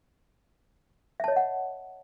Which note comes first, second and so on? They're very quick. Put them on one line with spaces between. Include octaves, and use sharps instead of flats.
E5 A5 C#5 D#5 F#5